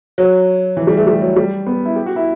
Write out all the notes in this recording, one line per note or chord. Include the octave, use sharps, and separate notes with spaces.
F#3
E3
G3
A3
G3
F#3
G3
B3
E4
G4
F#4
E4